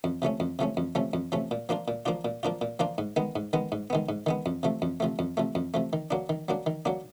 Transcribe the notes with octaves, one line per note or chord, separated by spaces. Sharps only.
F2
C3 F3 A3 C#4
F2
C3 F3 A3 C#4
F2
C3 F3 A3 C#4
F2
C3 F3 A3 C#4
A#2
F3 A#3 D4 F4
A#2
F3 A#3 D4 F4
A#2
F3 A#3 D4 F4
A#2
F3 A#3 D4 F4
G#2
D#3 G#3 B3
G#2
D#3 G#3 B3
G#2
D#3 G#3 B3
G#2
D#3 G#3 B3
F2
C3 F3 A3
F2
C3 F3 A3
F2
C3 F3 A3
F2
C3 F3 A3
D#3
F#3 A#3 D4
D#3
F#3 A#3 D4
D#3
F#3 A#3 D4